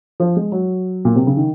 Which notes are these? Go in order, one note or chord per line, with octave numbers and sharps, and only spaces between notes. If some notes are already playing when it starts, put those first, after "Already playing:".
F3
G#3
F#3
A#2
C3
C#3
D#3